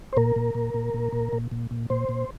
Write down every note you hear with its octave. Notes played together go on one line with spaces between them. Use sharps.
C5
A#2 A#4
A#2
A#2
A#2
A#2
A#2
A#2
A#2
A#2
A#2 C5
A#2